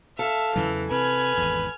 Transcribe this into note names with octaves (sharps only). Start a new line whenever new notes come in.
A4 E5 F5
E2 C#3 E3 F#3
C3 C4 B4 G#5 F6 G#6
G#1 E2